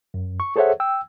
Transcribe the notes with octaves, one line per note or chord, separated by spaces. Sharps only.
F#2
C#6
G#4 A4 C5 C#5 E5 F#5
G5 E6